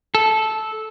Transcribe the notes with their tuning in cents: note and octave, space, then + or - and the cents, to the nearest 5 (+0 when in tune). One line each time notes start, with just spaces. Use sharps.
A4 -10